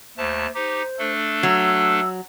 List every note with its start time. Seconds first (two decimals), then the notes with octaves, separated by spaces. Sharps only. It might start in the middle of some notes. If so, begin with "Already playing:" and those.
0.17 D#2 A3 C5 A5
0.55 D#4 G4 C5
0.99 A3 D4 A4
1.43 F#3 E6